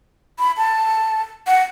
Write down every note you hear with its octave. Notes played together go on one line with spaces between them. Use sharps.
B5
A5
F#5